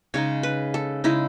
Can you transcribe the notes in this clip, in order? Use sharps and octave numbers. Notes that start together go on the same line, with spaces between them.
C#3 G#3 D#4 C#5
B4
A4
C#3 G#3 D#4 E4